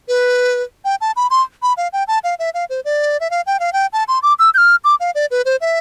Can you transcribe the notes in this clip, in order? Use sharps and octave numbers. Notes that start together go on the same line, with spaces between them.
B4
G5
A5
B5
C6
B5
F5
G5
A5
F5
E5
F5
C5
D5
E5
F5
G5
F5
G5
A5
C6
D6
E6
G6
F6
D6
F5
D5
B4
C5
E5